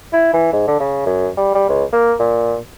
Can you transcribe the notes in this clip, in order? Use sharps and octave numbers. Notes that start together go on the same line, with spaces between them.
E4
E3
G#2
D3
C#3
F#2
G3
G3
C#2
A#3
A#2